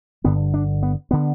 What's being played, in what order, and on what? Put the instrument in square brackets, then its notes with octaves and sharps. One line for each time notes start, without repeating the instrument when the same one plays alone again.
[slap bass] G1 G2 D3 B3
D4
B3
D3 B3